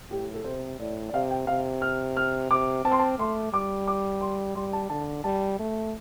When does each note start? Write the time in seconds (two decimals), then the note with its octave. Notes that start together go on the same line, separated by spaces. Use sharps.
0.10 A2 G4
0.34 A4
0.44 C3 C5
0.79 A2 D5
1.09 D5
1.13 C3 F5
1.30 G5
1.47 C3 F5
1.82 F6
2.17 F6
2.50 C3 D6
2.84 C4 A5
2.92 C6
2.99 A5
3.19 A3 C6
3.53 G3 D6
3.88 D6
4.21 C6
4.55 G3 C6
4.73 A5
4.90 D3 A5
5.24 G3 A5
5.59 A3